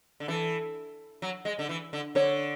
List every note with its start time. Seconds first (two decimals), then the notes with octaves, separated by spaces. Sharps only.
0.20 D3
0.28 E3 A4
1.22 F#3
1.45 G#3
1.59 D3
1.69 E3
1.93 D3
2.15 D3 C#5